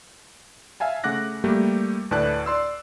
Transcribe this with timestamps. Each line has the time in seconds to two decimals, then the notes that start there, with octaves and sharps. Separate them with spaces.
0.80 E5 F5 G#5 A5
1.04 C#3 A3 F#5 D6 F#6 A#6
1.44 G3 A3 A#3 G4
2.11 D2 A2 B4 D5 A5 F#6
2.46 D5 C6 E6